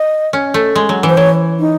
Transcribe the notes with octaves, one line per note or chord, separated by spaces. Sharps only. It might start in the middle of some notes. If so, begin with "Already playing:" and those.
Already playing: D#5
C#4
A3
G#3
F#3
E3
C5
E3 C#5
D#4